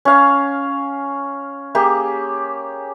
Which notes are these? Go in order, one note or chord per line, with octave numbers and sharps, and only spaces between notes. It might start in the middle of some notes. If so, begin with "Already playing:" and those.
C#4 F5
A#3 G4 G#4